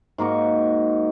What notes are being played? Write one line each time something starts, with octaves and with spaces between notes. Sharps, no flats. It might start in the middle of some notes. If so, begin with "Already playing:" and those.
G#2 A#3 F#4 C#6